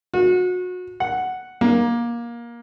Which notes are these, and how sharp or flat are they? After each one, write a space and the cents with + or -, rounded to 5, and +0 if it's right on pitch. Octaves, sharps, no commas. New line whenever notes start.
F#4 -30
F#5 +0
A#3 +20